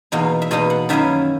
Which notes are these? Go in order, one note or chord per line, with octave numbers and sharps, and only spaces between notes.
E2 B2 A#3 D#4
E5
E2 B2 A#3 D#4 D#5
F#5
F#2 D#3 A#3 C#4 E4 E5